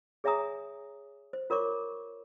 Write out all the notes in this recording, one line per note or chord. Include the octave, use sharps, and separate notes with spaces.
G#4 C#5 E5 G#5 A#5 D#6
C5
F4 A#4 C#5 C#6 D6